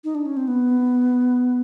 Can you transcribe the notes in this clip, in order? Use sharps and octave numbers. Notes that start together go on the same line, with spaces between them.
D#4
D4
C#4
C4
B3